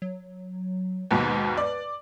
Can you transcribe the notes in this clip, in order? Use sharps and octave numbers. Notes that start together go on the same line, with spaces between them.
F#3
D#2 G#2 B2 B4
D5